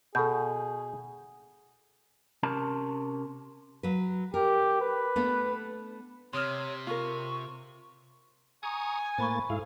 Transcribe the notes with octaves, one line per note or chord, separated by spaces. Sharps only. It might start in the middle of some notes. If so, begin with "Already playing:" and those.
B2 G#4 A4 G6
C3 C#4 A#4 A5
F#3 B4
G4 A#4
B4
A3 B3 D4
C3 C#5 C6 D#6 F6
F4 A#4 C#6
G#5 A#5 C#6 D#6
A2 A#3 C5 B5 C#6 A6
G#2 E4 A4 F5